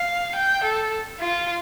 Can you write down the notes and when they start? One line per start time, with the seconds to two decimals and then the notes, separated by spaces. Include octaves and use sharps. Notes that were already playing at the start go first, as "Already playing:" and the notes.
Already playing: F5
0.36 G5
0.64 A4
1.20 F4